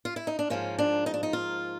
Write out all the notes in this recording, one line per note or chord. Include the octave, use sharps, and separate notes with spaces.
F4
E4
D#4
D4
G#2 F3 A#3 C#4
D4
D#4
D4
D#4
F4